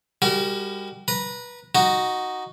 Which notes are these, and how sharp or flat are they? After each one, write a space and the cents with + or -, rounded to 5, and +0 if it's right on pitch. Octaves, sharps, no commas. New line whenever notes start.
G3 +25 F#4 +35 A#4 -25
B4 -20 A#5 +0
D#4 +0 F#4 +0